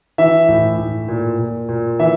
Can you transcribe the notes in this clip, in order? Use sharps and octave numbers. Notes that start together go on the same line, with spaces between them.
E3 E5
A2
A2
A#2
A#2
A#2
E3 E5